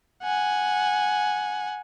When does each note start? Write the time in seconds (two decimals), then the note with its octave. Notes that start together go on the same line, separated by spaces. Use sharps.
0.23 F#5 G#5